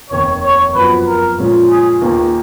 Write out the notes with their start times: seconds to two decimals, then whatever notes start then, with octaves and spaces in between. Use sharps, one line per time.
0.10 F1 D#2 D#3 C#5
0.42 C#5
0.74 F#2 F3 B3 F#4 B4
1.06 A#4
1.38 A#2 F3 G#3 C#4 F4
1.70 G#4
2.01 D#2 D#3 A#3 F4 G#4